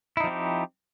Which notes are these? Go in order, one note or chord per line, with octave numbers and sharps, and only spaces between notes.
F3 C4 D#4 E4 G4